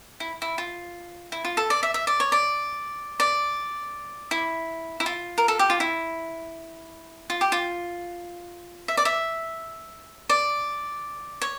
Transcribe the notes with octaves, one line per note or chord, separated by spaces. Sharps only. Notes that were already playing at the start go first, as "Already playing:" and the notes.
E4
E4
F4
E4
F4
A4
D5
E5
E5
D5
C#5
D5
D5
E4
E4
F4
A#4
A4
G4
F4
E4
F4
G4
F4
E5
D5
E5
D5
C#5